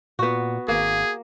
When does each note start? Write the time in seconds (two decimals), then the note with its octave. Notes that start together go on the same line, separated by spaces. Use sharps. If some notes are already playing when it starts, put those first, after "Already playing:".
0.19 A#2 B3 F#4
0.68 G#1 A#3 G#4